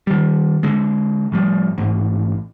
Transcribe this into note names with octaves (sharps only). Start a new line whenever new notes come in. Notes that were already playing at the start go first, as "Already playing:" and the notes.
D#3 G3
D3 G#3
A2 F3 G3
A1 G#2